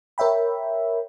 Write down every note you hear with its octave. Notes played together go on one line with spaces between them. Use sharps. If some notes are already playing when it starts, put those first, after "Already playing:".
A#4 C#5 E5 G5 B5